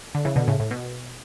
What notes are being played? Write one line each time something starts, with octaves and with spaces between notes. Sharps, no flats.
D3
C#3 E3
B2 D3
A2 C#3
A2
B2